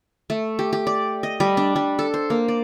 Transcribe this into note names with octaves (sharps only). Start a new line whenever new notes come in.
A3
G4
G4
D5
D#5
G3
D4
G3
A4
C5
A#3
D5